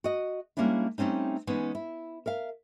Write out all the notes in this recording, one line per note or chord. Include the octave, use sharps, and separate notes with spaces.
F#4 D#5
G3 G#3 A#3 C#4 D4 E4
G3 A3 C4 C#4 D#4
E3 G#3 B3 C#4 D#4
E4
A#4 E5 F5